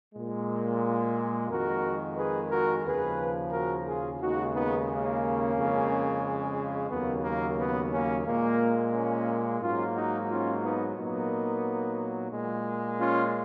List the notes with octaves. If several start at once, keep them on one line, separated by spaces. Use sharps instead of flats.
A#2 G#3
F2 D#3 G#3 F#4 A#4
G#4 B4
F#4 A#4
D#2 C#3 F3 G#4 B4
F#4 A#4
F4 G#4
D#2 C#3 G#3 D#4 F#4
B3 D#4
A#3 C#4
F2 C#3 G#3
D#2 C#3 F#3 A#3 B3
A#3
B3
A#3 C#4
A#2 G#3 A#3
A#3 C#4
G#2 F#3 A#3 C#4 F4
D#4 F#4
C#4 F4
B3 D#4
A#2 F#3 A#3 B3 D#4
A#2 G#3
C#4 F4